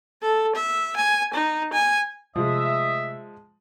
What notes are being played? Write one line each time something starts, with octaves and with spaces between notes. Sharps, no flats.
A4
E5
G#5
D#4
G#5
C3 F3 G#3 A3 D#5 E5